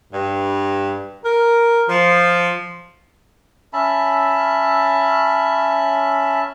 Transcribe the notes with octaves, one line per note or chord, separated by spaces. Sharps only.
G2
A#4
F3
C#4 E5 A5 B5